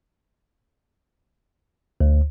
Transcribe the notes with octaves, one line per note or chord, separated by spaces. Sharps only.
D2